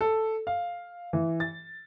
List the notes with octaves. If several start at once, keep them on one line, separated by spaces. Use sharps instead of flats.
A4
F5
E3
A6